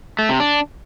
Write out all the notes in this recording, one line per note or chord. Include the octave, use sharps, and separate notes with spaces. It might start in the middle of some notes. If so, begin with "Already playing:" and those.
A3
C3
D4